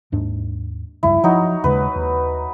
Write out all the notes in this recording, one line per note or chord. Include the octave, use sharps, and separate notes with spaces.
D#2 G#2 D4
F1 C#2 G2 E4
F3 F#3 D#4
D#2 C#3 G#3 B4
D#2